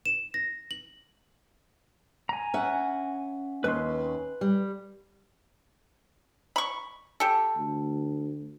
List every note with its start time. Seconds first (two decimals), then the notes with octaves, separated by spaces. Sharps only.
0.06 E7
0.34 A#6
0.71 F#7
2.29 G#5 A#5
2.54 C#4 E5 F#5
3.64 D#2 C#4 B4 C6
4.41 G3
6.56 B5 C#6
7.20 G4 A4
7.57 D2